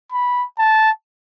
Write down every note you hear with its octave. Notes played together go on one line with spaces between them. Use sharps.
B5
A5